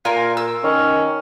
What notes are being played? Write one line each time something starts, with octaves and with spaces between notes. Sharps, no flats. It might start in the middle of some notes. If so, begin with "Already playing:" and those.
A#2 F4 A#4 G#5
E6
D#3 C#4